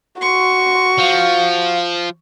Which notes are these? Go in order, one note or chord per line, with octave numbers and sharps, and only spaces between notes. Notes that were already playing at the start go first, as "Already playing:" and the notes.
F#4 C6 C#6
F3 F5